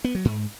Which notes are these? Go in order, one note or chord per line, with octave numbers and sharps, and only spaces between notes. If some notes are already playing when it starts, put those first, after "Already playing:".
B3
F#3
G#2